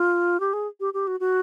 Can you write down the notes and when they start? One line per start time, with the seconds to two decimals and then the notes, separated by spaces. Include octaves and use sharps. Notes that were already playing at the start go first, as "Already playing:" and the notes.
Already playing: F4
0.40 G4
0.53 G#4
0.80 G4
0.94 G4
1.07 F#4
1.20 F#4